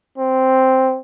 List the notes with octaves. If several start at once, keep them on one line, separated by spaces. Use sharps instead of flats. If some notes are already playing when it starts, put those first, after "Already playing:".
C4